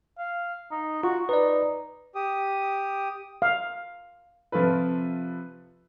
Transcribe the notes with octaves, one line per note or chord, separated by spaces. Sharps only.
F5
D#4
F4 F#4
D#4 B4 D5
G4 D#6
F5
C3 F3 F4 A4 B4